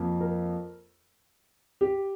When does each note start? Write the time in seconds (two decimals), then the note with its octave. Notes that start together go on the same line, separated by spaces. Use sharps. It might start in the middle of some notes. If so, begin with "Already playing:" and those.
Already playing: F2 F3 A#3
0.21 A#4
1.81 G4